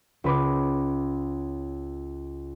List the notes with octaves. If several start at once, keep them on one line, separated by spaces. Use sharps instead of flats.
C#2 B4 D6